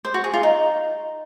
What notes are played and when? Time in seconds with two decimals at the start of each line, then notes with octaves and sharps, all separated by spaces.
0.05 C5
0.14 F#4
0.24 G#4
0.34 F4
0.43 D#4